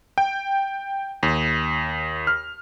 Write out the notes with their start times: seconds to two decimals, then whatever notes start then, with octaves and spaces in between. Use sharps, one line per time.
0.18 G5
1.23 D#2
2.27 F6